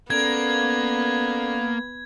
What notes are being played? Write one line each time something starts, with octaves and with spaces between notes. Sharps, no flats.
A#3 B3 C#4 A4 D5 G#6